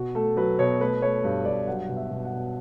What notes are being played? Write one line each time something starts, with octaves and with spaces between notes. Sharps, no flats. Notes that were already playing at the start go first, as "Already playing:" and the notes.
Already playing: B2 F#4
A3 A4
F#3 B4
B2 C#5
A3 B4
A3 C#5
G2
G2 D5
F#3 F#5
B2
E5
B2
F#5
B2